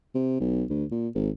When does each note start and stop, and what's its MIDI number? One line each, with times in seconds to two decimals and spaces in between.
0.15 0.38 48
0.40 0.64 35
0.70 0.84 38
0.91 1.08 46
1.15 1.30 32